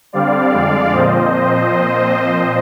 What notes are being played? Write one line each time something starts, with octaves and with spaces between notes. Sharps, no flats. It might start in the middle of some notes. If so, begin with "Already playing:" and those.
D3 G3 C4 D5 F5
F2 D3 G#3
A#2 F3 C4 C5 D#5